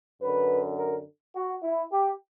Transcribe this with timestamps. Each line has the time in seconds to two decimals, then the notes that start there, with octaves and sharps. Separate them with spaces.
0.21 F#2 D3 B4
0.78 A#4
1.36 F#4
1.63 E4
1.93 G4